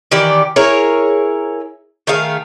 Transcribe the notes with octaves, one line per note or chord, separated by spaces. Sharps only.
D#3 E3 G4 D5
E4 G#4 A#4 C#5
D#3 A3 G#4 F5